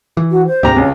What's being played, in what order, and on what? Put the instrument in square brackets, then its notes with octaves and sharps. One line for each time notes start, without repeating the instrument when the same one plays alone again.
[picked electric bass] E3
[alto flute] F#4
C5
[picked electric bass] D2 G#2 C3 [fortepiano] G4 A#5
[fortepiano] C#2 [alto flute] C#4